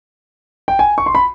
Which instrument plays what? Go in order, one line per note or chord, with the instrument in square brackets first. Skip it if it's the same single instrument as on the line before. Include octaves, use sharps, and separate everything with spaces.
[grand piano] G5
G#5
C#6
C6
B5